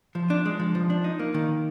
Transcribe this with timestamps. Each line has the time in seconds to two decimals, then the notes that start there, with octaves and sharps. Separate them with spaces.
0.15 F3
0.30 D4
0.46 G#3
0.60 F3
0.75 F3
0.90 D4
1.04 D#4
1.20 A#3
1.34 D#3